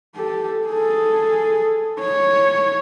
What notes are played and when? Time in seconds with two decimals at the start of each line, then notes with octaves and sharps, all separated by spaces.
0.16 G4 A4
0.68 G#4 A4
2.00 C#5